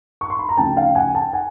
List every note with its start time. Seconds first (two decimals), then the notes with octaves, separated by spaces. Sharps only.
0.21 C#6
0.30 C6
0.39 B5
0.49 A#5
0.57 D2 C#3 F3 G5 A5
0.76 F5 G5
0.95 F#5 G#5
1.14 G5 A5
1.33 F#5 G#5